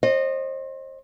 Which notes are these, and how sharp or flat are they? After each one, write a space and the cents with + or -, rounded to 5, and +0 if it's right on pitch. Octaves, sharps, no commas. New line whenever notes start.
C5 +30 D#5 -25